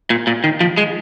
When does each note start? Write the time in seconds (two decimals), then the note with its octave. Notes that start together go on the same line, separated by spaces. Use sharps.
0.10 A#2
0.27 A#2
0.44 D#3
0.61 F3
0.77 G#3